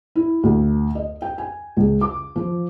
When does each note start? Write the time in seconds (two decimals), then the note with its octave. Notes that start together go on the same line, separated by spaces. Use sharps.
0.15 E4
0.43 D2
0.95 D#5
1.22 G5
1.38 G#5
1.77 C#2
2.01 D6
2.36 F3